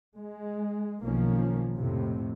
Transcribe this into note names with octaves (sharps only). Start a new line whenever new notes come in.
G#3
B1 D#3 F3 A#3 C#4
F2 A2 C3